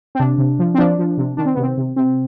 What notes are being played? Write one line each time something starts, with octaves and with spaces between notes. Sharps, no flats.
C4
C3 D4
C3
F3
C4
F3 D4
F3
C3
D#3 D4
C4
C3 B3
C4
C3
C3 C4